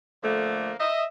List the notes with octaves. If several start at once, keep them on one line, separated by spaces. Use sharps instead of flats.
D3 F3 A3 A#3
D#5 E5